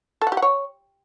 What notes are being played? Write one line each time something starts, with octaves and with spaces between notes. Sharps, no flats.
A4
F#5
G4
F#5
C#5